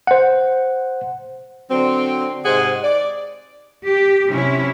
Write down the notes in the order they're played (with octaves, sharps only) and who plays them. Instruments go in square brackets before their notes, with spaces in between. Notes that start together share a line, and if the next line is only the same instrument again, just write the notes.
[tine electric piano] C5 F#5
[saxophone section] D3 F#3 C4
G#2 C3 G#4 C5 F#5
D5
[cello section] G4
C3 F#3 C#4 E4